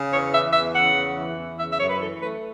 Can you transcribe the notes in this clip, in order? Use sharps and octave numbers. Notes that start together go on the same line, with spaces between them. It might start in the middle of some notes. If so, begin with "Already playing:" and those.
Already playing: C#3
E2 C#5
E3 E5
E2 E5
C#3 F#5
E2
E3
E2
C#3 E5
E5
F#2 C#5
B4
E3 A4
A3 B4